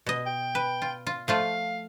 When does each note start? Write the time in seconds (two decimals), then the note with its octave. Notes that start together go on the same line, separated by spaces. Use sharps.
0.06 B2 D#5
0.26 G5
0.55 B4
0.82 F4
1.07 F4
1.28 F3 A3 F4 F5